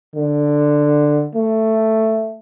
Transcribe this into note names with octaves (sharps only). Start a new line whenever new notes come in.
D3
A3